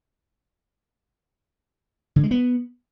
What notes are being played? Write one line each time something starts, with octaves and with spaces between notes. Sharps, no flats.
D3
G#3
B3